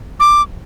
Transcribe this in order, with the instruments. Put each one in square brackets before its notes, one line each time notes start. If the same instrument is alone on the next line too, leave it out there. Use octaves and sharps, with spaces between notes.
[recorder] D6